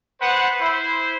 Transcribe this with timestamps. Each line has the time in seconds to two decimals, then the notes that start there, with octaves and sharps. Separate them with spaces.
0.21 B3 B4 C5 F#5
0.61 E4 C5